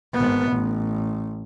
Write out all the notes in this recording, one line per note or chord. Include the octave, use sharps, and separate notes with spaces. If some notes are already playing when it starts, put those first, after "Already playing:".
G#1 B3
A1